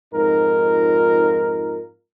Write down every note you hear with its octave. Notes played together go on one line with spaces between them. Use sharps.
F2 G#2 D#4 F4 A#4